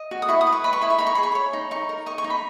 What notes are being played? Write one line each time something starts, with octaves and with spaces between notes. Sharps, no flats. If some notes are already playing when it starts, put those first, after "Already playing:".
Already playing: D#5
F#4
D#6
E4 C#6
D#6
B4
C#6
D#5 B5
C#6
E4 B5
C#6
D#4 B5
C#6
G#4 B5
C#6
C#5 B5
D#4
D#4 C#6
A#4
D#5 C#6
C#6
D#4
B5